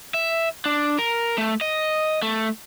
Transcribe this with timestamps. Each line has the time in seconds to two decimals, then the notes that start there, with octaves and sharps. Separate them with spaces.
0.14 E5
0.65 D4
0.99 A#4
1.38 A3
1.61 D#5
2.22 A3